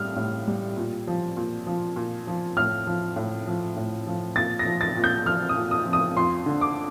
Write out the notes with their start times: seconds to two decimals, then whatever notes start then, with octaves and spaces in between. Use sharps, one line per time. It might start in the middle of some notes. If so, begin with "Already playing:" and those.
Already playing: A2 G3 F6
0.16 A2
0.47 G3
0.77 A#2
1.07 F3
1.37 A#2
1.67 F3
1.96 A#2
2.27 F3
2.57 A2 F6
2.87 F3
3.16 A2
3.47 F3
3.76 A2
4.07 F3
4.36 A#2 A6
4.59 A#6
4.66 F3
4.81 A6
4.97 A#2
5.04 G6
5.26 F3 F6
5.49 D#6
5.56 A#2
5.71 D#6
5.86 F3
5.93 D#6
6.16 F2 C6
6.46 D3
6.61 D6